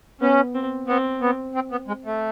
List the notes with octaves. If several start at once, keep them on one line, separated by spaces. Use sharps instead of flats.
B3 C#4
C4
B3 C4
B3
C4
B3
G#3
A3